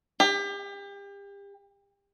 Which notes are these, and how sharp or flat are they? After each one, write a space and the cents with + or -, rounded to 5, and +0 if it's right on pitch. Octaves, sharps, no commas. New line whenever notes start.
G4 +35